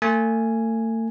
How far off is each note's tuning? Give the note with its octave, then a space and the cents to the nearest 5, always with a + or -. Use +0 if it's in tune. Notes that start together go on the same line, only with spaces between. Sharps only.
A3 +40 G#5 +0